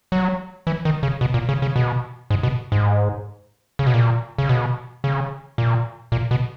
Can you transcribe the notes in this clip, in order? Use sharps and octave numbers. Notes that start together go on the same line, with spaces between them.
F#3
E3
D#3
C#3
B2
A#2
C#3
C#3
B2
G#2
B2
G#2
C#3
B2
A#2
C#3
B2
C#3
A#2
A#2
B2